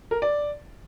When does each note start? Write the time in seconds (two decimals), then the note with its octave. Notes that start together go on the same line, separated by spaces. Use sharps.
0.11 A#4
0.22 D5